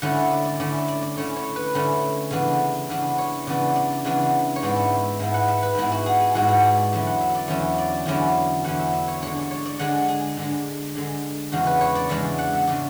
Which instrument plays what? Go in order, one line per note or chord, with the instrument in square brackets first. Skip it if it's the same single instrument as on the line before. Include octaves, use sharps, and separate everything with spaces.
[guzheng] D3 A3 C#4 E4 F#5
E5
D5
D5
D3 A3 C#4 E4 D5
E5
D5
D5
D3 A3 C#4 E4 C#5
C#5
B4
D3 A3 C#4 E4
C#3 E3 B3 D4
C#3 E3 B3 D4 E5
C#5
C#3 E3 B3 D4 D5
D5
C#3 E3 B3 D4
C#5
G#2 G#3 B3 E4 D5
E5
E5
G#2 G#3 B3 E4 E5
F#5
E5
B4
G#2 G#3 B3 E4 G#4
F#4
G#4
G#4
G#2 G#3 B3 E4 F#4
G#4
G#4
D5
E2 D3 F#3 C#4 E4 E5
F#5
E5
D5
E2 D3 F#3 C#4 E4 E5
D5
E2 D3 F#3 C#4 E4 D5
E2 D3 F#3 C#4 E4 F#5
E5
E5
C#5
D3 G#3 D4 C#5
D5
C#5
D5
D3 G#3 D4 F#5
G#4
D3 G#3 D4
D3 G#3 D4
E2 C#3 G#3 D4 F#4
B4
C#5
D5
E2 C#3 G#3 D4 E5
D5
F#5
E5
C#3 G#3 D4 D5